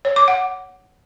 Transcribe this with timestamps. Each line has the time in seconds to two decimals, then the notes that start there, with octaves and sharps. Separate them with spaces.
0.05 C#5
0.16 D6
0.28 F#5